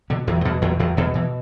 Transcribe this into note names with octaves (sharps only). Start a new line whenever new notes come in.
B2 D3
E2 E3
G3
B2 D3 F#3
E2 D3 F#3
E2 D3 F#3
B2 D3
B2 E3